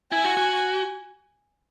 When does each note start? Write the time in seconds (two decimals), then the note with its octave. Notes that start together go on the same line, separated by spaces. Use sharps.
0.12 E4 G#5
0.24 F#4
0.37 F#4